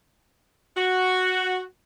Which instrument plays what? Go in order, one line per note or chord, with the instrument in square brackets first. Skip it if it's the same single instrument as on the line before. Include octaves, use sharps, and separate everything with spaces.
[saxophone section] F#4